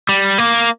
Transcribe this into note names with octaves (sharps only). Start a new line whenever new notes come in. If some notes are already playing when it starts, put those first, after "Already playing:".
G3
A#3